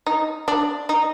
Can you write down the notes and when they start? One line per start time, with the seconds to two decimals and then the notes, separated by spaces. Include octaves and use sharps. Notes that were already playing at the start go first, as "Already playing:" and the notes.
0.06 D#4
0.48 D4
0.89 D#4